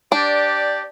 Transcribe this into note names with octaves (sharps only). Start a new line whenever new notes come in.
D4 G4 D5